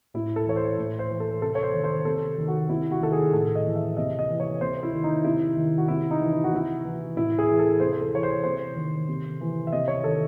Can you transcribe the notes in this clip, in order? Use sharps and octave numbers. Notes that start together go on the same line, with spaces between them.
A2 E4
A4
E3 C#5
C5
A2
C5
E3
A4
C3 A4
C#5
C5
D#3
C5
C3 A4
D#3
F#4
C3 E4
F#4
D#3 A4
G#4
A2 A4
D#5
E3
E5
C3 D#5
D#5
E3
C#5
C3 C5
E4
D#3
D#4
C3 E4
D#3
F#4
C3 E4
D#4
E3
E4
F#4
C3 E4
E3
A2 E4
G#4
E3
A4
C3 C5
C5
A4
E3 C#5
C5
C3 C5
D#3
C3
E3
E5
C3 D#5
C#5
D#3 A4